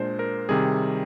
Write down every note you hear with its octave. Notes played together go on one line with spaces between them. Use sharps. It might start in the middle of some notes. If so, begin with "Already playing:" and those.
Already playing: A#2 G#3 D4 C5
A#4
C3 D#3 G3 G#4